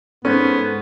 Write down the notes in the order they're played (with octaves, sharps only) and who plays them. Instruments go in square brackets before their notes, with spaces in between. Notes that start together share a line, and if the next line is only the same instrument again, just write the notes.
[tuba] G#2 [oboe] B3 [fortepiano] C#4 [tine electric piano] A4 C5